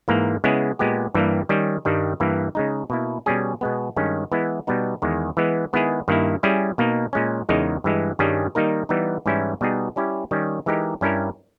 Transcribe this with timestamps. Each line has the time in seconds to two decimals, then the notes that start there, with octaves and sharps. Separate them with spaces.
0.08 G#2 E3 A#3
0.44 C#3 G#3 B3 E4 G#4
0.79 A#2 G#3 B3 G4
1.14 G2 E3 G3 A#3
1.49 D#3 G3 C#4
1.85 G2 D#3 G3
2.20 G2 E3 A#3
2.55 C#3 G#3 D#4
2.90 B2 A#3 E4
3.26 B2 G3 C#4 G#4
3.61 B2 G#3 B3
3.96 G2 D#3 G#3 C#4
4.32 E3 G#3 B3 E4
4.67 B2 G3 B3 D#4
5.02 E2 D#3 G#3
5.37 E3 G#3 B3
5.73 D#3 G#3 B3 E4 G#4
6.08 G2 D#3 A#3 E4
6.43 G3 C#4 E4 G#4
6.78 B2 A#3 D#4
7.13 A#2 G#3 C#4
7.49 E2 C#3 G#3 D#4 A#4
7.84 G2 E3 G#3
8.19 G2 D#3 G3 C#4 G#4
8.55 D#3 G3 A#3 D#4 A#4
8.89 E3 G3 B3 D#4
9.26 G#2 E3 G3 C#4 E4
9.61 B2 G3 B3 D#4 G#4
9.96 G3 C#4 E4 G4
10.31 D#3 G3 C#4
10.66 E3 G#3 D#4 G4 A#4
11.01 G2 G3 C#4 E4 A#4